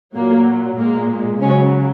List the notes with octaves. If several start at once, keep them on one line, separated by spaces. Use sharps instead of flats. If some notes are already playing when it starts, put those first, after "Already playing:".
A#2 F#3 A#3
A#2 G#3 A#3
C#3 F#3 G#3 C#4